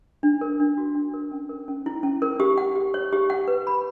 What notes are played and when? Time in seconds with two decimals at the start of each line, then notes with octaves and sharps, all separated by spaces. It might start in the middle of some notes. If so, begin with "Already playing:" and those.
0.23 D4
0.41 A#4
0.60 D4
0.78 F#4
0.95 D4
1.14 A#4
1.32 C#4
1.49 A#4
1.68 C#4
1.86 E4
2.03 C#4
2.22 A#4
2.40 G4
2.58 F#5
2.75 G4
2.94 C#5
3.13 G4
3.30 F#5
3.48 B4
3.67 B5